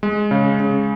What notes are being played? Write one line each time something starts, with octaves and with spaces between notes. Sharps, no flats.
G#3
C#3
C#3